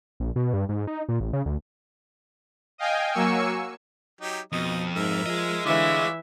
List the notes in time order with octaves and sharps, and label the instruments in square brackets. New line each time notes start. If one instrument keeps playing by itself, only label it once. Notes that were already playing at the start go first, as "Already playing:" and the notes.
[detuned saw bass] A#1
B2
G2
G#2
D#4
A#2
A1
C#3
D2
[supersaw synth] D#5 F5 G5 G#5
F#3 A#3 G#5 C#6 E6 C#7
[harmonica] F#3 D#4 G4
[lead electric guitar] F2 [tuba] B2 [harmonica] D#4 D#5
[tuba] G#2 [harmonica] A#4 E5
[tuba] F3 [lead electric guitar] G#4 D#5
[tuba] D3 [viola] E3 E5 [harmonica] F4 C#5 D5